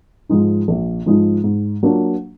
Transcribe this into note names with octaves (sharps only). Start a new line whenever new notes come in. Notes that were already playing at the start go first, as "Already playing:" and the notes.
G#2 F3 G#3 D#4
A#1
G#2 F3 G#3 D#4
G#2
F#3 A#3 D4 F4